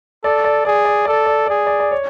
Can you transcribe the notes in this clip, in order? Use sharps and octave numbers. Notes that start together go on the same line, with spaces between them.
A4 D5
D5
G#4 D5
D5
A4 D5
D5
G#4 D5
D5
D5
C#5